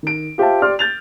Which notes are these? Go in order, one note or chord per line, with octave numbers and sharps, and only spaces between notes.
D#3 D7
F4 G4 C5 E5 F5 A5
G4 D5 C6 F6
G6 A6 F7